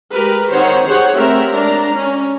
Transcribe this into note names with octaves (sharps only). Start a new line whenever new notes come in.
G#3 G4 A#4 B4
D#3 C4 C5 C#5 F#5
G4 G#4 C5 C#5 F#5
A3 C4 G4 A#4 E5
G#3 D4 A#5
C#4